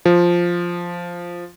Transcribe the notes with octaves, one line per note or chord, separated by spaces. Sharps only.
F3